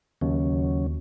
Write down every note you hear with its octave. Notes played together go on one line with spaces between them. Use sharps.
D#2 C#3 F#3 C#4